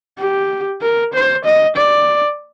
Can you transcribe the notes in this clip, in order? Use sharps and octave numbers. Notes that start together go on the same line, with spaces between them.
G4
A#4
C5
D#5
D5